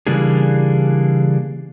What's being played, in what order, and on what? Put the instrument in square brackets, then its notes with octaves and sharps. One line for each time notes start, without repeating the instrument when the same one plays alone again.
[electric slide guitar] C#3 E3 G3 A#3 D4 G#4